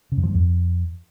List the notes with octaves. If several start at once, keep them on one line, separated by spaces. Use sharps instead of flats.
C#3
F#2
F3
G2
F2